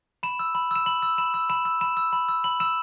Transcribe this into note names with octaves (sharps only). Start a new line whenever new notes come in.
B5 E7
E6
B5
E6 E7
B5 F#7
E6
B5 E7
E6
B5 E7
E6
B5 E7
E6
B5
E6
B5 F#7
E6 E7